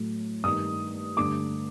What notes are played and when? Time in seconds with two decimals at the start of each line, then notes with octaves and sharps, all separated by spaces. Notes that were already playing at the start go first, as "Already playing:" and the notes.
Already playing: A2 F#3 A3
0.44 G2 D#3 A3 D#6
1.17 G2 D3 A3 D6